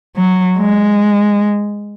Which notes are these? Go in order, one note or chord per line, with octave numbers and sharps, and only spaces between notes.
F#3
G#3